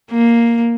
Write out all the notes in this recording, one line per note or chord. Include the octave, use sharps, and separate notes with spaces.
A#3